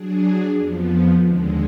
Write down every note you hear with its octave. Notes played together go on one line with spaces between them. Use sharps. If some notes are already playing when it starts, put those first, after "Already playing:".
Already playing: F#3 D4 G#4
F2 F3 B3
D#2 D3 G#3